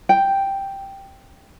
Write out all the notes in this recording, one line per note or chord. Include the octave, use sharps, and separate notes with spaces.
G5